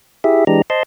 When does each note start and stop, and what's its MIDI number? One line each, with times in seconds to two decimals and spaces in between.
0.24 0.45 64
0.24 0.45 67
0.24 0.45 68
0.24 0.45 76
0.47 0.62 52
0.47 0.62 56
0.47 0.62 62
0.47 0.62 67
0.47 0.62 82
0.70 0.83 72
0.70 0.83 75
0.70 0.83 81
0.70 0.83 84